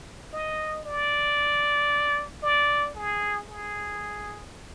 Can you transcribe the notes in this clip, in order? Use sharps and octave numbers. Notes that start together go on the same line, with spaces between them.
D#5
D5
D5
G#4
G#4